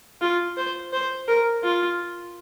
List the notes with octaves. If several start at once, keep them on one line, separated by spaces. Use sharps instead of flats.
F4
C5
C5
A#4
F4